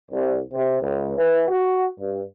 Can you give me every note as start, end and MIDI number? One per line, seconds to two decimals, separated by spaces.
0.11 0.38 36
0.53 0.81 48
0.81 1.15 37
1.17 1.46 52
1.48 1.86 66
1.99 2.21 43